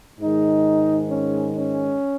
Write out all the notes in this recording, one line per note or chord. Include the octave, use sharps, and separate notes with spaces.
G#2 D#3 G#3 D#4
C#4
C#4